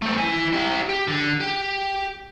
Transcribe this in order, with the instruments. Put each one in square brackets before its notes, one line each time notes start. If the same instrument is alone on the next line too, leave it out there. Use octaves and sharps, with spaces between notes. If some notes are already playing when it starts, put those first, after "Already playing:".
[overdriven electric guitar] A3 C4
E4 G#5
E4 G4
G4
D3
G4